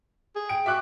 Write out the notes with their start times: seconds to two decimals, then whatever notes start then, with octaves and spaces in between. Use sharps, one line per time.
0.36 G#4
0.49 G5 D7
0.66 F#4 E5 D6 F#6